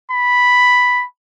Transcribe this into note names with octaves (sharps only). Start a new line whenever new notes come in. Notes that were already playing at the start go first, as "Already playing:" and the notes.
B5